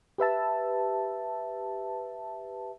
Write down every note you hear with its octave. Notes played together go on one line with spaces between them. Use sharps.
G4 B4 E5 A5